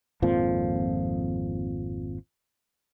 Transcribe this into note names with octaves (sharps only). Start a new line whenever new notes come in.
G#1 F2 A#2 F3